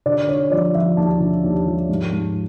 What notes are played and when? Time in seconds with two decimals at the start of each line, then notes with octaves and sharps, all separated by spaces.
0.06 D3 D5
0.28 D3 C#5
0.51 F3 D5
0.75 F3 E5
0.97 D#2 A5
1.20 D3
1.44 D#2
1.66 F3
1.89 G#2
2.12 G#2